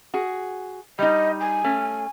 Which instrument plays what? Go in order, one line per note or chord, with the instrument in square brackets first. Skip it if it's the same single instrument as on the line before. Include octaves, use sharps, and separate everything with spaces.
[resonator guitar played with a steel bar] F#4 G#4
[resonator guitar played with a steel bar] G3 D#4 [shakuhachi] D#5
[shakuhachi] G#5
[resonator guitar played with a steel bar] A3 C#4